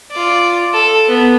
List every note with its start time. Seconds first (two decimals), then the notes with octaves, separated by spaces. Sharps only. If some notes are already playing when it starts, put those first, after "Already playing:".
0.12 F4 D5
0.73 A4
1.08 B3